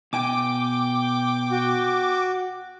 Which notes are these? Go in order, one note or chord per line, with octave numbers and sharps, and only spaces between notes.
B2 G5 G#5 D6
F#4